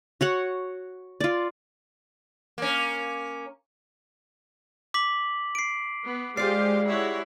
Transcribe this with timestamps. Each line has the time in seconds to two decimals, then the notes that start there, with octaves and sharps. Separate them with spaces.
0.21 F#4 C#5 F#5
1.20 F4 D5
2.58 A#3 C#4
4.94 D6 B6 F#7
5.55 C7 D7
6.05 B3
6.37 G3 G#3 F4 G4 C5 D5 F5 C7
6.85 E4 F#4 C#5